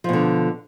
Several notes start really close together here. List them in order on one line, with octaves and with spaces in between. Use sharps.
F3 B2 D3